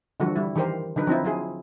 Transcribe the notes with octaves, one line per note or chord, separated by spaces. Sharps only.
D3 E3 F3 G3 F#4 A4
G3 E4
D#3 E3 G4 A#4 C5
D3 F#3 D#4 B4
F3 C4 D#4 E4
F#3 E4 F4 G#4